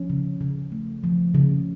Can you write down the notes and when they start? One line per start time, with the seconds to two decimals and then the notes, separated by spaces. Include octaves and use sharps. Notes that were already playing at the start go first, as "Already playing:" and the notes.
Already playing: F3 C#4
0.10 C#3
0.41 C#3
0.72 A3
1.04 F3
1.35 C#3